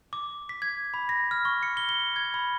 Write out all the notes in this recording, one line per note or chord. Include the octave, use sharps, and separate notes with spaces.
D6
B6
G#6
B5
A#6
F6
C#6
C#7
G7
G7
G#6
B5